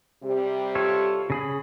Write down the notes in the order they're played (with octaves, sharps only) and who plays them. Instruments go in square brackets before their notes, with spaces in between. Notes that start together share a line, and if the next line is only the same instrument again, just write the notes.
[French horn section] C3 G3 G4
[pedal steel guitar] F4 A4 C#5
C#3 G#4 B5